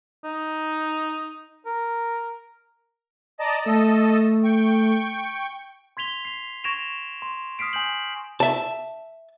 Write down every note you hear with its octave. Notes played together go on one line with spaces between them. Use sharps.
D#4
A#4
D5 D#5 A5 A#5
A3 A4 D#5 E6
G5 C#6
C6 G#6 B6 F7 G7
C7 F7
C#6 G#6 A#6 D7 E7 F7
C6
D#6 F6 B6 C7 D7
G#5 C6 G6 F#7
E5 A5